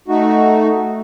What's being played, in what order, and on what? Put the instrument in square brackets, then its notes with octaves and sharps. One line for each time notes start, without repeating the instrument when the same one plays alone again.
[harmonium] A3 D#4 F#4